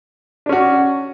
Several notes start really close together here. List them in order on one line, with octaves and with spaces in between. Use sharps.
D4 C#4 F#4